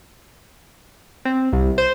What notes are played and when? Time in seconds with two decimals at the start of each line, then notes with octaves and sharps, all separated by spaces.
1.25 C4
1.53 C2
1.78 C5